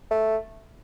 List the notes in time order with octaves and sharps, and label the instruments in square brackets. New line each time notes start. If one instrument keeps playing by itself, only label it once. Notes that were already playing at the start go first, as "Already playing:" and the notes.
[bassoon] A3